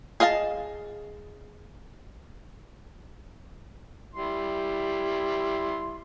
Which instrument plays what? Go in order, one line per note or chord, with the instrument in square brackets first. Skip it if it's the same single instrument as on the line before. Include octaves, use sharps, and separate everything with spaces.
[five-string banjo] G#4 D#5 F5 G#5 A5
[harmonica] G3 E4 C6